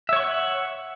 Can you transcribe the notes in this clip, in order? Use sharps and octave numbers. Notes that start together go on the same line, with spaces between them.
C#5 E5 F#5 C#6